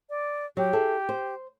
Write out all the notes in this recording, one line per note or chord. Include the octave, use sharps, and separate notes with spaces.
D5
F#3 G4
E4 G#4 A4
C5